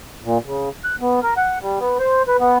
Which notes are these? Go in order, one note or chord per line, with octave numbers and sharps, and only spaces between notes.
A#2
C#3
F#6
B3
A#4
F#5
G3
B3
C5
B4
B3